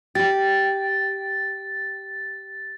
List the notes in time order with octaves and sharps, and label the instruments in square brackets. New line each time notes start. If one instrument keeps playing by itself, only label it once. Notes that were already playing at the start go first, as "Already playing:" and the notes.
[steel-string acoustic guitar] G4 [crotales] A6